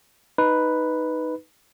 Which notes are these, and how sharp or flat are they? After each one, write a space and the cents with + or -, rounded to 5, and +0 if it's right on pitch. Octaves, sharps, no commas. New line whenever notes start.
D#4 +0 B4 +0